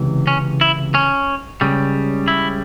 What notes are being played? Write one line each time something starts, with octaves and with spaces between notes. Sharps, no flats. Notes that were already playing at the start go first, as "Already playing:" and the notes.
Already playing: C#2 C3 E3
C#4
E4
C#4
C#2 C#3 G3
E4